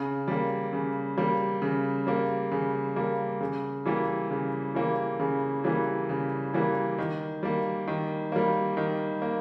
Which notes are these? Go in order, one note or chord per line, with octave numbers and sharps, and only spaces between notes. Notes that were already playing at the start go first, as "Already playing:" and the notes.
Already playing: C#3
G3 A#3
C#3
G3 A#3
C#3
G3 A#3
C#3
G3 A#3
C#3
E3 G3 A#3
C#3
E3 G3 A#3
C#3
E3 G3 A#3
C#3
E3 G3 A#3
D#3
G3 A#3
D#3
G3 A#3
D#3
A#3